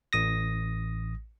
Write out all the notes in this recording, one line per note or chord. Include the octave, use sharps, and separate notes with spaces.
A1 D#6 A#6